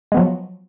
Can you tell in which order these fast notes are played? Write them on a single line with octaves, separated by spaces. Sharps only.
G#3 B3 F3 F#3